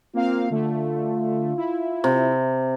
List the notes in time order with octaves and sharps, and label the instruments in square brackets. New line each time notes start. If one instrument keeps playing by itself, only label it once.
[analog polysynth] A#3 C4 F5 [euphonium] F4
[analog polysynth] D3 A3 [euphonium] F4
[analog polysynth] E4
[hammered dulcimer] C3